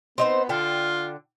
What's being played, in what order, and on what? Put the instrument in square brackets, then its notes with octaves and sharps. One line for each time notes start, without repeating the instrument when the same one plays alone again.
[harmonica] B3 [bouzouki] C4 D#4 C5
[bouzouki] D3 G5 [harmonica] F4